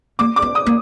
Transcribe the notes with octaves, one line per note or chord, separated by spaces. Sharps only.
A#3 D6
D6
B3
D#6
A#3